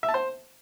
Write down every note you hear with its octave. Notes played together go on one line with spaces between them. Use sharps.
E5
A5
C5